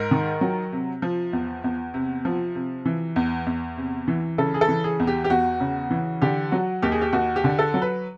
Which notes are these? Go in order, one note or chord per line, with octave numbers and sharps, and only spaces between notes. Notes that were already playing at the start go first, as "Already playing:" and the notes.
Already playing: G#2 A#4
D#3
F#3
C3
F3
E2
E2
C3
F3
C3
E3
E2
E2
C3
E3
C#3 A4
G#4
A4
E3
G#4
E2
G4
G4
E2 F#4
C#3
E3
D3 G4
F#3 F#4
D#2 G4
G#4
G4
D#2 F#4
G4
D3
A4
F#3
B4